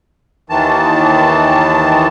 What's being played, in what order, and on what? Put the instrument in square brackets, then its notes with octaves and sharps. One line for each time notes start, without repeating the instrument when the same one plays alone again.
[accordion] D#2 D#3 E3 A5